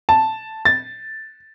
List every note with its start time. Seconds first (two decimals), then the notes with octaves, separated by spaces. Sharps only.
0.09 A5
0.65 A6